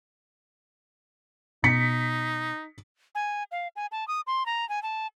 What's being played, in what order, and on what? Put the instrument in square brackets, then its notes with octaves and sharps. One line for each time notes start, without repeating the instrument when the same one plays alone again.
[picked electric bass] B2 [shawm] D#4 [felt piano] B6 C#7
[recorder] G#5
F5
G#5
A5
D#6
C6
A#5
G#5
A5